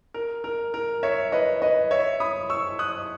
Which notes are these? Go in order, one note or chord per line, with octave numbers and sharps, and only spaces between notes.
A#4
A#4
A#4
C#5 E5
B4 D#5
B4 D#5
C#5 E5
B5 D#6
C#6 E6
D#6 F#6